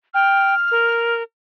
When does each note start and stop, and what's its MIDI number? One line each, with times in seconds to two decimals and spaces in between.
0.14 0.55 79
0.14 1.14 89
0.71 1.23 70